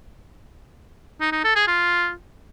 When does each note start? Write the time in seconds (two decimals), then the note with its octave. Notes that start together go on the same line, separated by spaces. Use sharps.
1.21 D#4
1.32 D#4
1.44 A4
1.56 G#4
1.67 F4